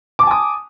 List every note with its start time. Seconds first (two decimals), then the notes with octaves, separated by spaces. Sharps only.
0.19 D6
0.23 A5
0.27 G#5
0.31 D#6